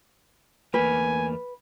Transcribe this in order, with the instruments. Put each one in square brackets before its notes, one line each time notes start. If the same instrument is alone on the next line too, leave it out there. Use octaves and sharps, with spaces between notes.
[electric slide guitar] E2 A3 A#3 [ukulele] B4 [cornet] G#5